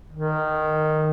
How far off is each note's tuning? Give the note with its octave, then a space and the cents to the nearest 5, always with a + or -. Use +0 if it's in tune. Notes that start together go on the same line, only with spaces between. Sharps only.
D#3 -10